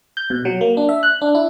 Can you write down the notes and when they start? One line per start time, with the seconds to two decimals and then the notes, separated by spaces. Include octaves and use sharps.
0.17 G6
0.30 B2
0.45 F#3
0.61 A#3
0.77 D4
0.89 E5
1.03 F#6
1.22 D4
1.35 E4